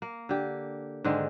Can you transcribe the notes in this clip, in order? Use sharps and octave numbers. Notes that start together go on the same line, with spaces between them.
A#3
D3 G4
G#2 D3 D#3 G#3